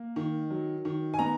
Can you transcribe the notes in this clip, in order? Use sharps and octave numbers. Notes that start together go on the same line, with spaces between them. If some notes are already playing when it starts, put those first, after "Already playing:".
Already playing: A#3
D#3
F#3
D#3
G#5
B3 A#5